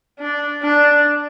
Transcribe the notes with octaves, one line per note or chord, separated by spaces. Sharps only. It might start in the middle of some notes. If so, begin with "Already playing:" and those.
D4
D4